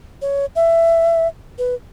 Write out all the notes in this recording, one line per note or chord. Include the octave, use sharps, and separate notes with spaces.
C#5
E5
B4